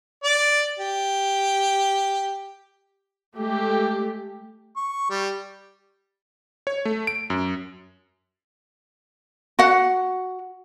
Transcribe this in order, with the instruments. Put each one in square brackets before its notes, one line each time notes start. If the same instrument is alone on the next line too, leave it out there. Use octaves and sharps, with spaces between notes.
[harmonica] D5
G4
[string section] G#3 A3 G4
[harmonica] C#6
G3
[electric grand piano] C#5
A3
D7
F#2
[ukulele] F#4 F#5